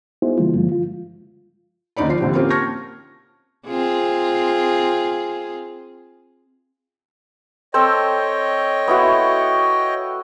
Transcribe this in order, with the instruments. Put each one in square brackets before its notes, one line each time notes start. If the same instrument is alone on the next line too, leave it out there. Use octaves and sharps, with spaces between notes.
[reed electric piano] B3 D#4 E4 F#4 G#4 C5
C#3 E3 G3 A#3 F4
G2 D3 F3 G#3 F4
F4
[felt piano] D#2 D3 C#4 D#4 D5 B5
F3 F4 D5 C7
A#2 D3 F3 C4 G4
A#3 C4 C#4 F4 G4
A5 C#6 F6 G#6 A#6
[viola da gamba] C4 F4 G#4
[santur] C4 A4 C5 [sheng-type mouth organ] C#5 D#5 G5
[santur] B3 E4 F#4